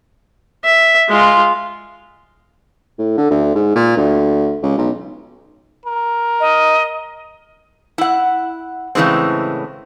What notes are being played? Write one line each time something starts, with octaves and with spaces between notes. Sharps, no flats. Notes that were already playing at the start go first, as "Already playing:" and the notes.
E5
G#3 F4
A2
D3
D2
G#2
A#2
D2
C#2
B1
A#4
D#5
E4 F#5
A2 C#3 E3 G#3 C4